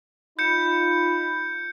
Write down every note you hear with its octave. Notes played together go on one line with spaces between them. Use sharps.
D#4 F4 B5 G6 C#7